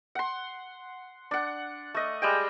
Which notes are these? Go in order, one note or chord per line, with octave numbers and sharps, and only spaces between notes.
F#5 C6
D4 F#5
A3 D#5
G3 G#3 G5